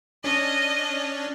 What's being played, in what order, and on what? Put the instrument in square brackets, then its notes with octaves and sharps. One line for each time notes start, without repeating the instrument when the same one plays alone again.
[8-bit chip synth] C#4 D4 [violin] D#5